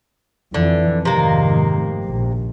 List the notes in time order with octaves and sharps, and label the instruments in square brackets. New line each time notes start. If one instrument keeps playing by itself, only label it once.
[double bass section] F2 E3 [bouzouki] D3
[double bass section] F1 G#2 D#3 [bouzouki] C3 A#3
[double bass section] A#1